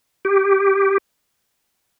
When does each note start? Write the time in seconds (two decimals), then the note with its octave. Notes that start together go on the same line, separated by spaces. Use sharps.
0.25 G4